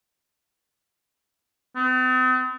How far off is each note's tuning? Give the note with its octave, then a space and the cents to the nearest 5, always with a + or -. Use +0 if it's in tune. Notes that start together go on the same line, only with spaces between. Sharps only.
C4 -45